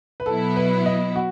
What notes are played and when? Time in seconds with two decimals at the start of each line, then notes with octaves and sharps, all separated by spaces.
0.20 B4
0.26 B2 F#3 B3 E4 A4
0.56 B4
0.86 D#5
1.16 F#4